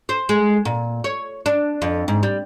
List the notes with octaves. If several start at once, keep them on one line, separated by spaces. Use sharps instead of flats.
C5
G#3
A#2
C#5
D4
F2
G#2
G3